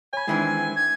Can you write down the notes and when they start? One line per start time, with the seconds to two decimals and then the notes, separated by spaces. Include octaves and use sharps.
0.13 C#5 G#5 B5
0.27 D#3 E3 G#3 C4 D4
0.76 G#6